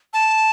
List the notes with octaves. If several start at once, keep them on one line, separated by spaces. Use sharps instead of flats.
A5